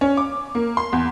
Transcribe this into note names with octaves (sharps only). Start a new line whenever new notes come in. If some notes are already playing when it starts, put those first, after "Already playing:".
C#4
D6
A#3
C6
E2